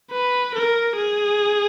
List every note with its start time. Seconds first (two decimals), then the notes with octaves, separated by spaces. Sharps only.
0.12 B4
0.54 A#4
0.96 G#4